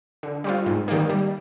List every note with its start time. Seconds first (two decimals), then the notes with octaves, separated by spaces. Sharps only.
0.23 D3
0.44 G3 C4 F4
0.66 G#2
0.88 D#3 G3 A#3
1.09 G3